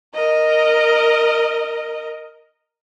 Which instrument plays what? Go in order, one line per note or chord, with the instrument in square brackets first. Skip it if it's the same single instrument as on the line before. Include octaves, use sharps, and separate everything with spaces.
[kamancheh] A#4 D#5